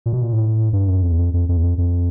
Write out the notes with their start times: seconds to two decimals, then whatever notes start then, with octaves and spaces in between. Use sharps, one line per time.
0.06 A#2
0.13 B2
0.22 A#2
0.33 A2
0.73 G2
0.88 F#2
1.03 F2
1.12 E2
1.18 F2
1.34 F2
1.49 F2
1.57 E2
1.63 F2
1.78 F2